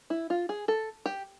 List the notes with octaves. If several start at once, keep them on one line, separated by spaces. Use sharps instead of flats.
E4
F4
G#4
A4
G4